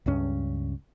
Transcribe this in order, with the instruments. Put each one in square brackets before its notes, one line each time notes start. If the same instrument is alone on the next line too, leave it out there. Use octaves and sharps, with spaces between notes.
[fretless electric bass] C#2 G2 C#4